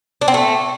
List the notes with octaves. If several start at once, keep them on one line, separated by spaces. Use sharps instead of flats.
D4
C4
A3